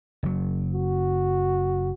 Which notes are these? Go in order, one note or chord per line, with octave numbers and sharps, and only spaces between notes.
F#1 F#3
F#4